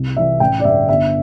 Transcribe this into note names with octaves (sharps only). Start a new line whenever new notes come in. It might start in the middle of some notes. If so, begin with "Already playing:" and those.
Already playing: C2
C3 E3 E5
A1 G5
D5
G2 D3 E5
G1 E5